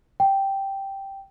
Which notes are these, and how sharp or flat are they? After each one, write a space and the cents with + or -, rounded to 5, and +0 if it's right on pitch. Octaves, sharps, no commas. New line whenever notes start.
G5 -5